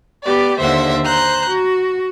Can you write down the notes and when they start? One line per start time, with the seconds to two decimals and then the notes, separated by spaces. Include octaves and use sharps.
0.24 B3 G4 D5
0.60 D#2 D3 C5 E5 F#5
1.04 C5 A#5 F#6 G6
1.50 F#4